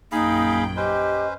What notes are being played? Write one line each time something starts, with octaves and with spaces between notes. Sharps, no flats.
A#1 F#2 A#3 D#4 G#4 F5 G5 B5
C#4 G4 B4 C5 D#5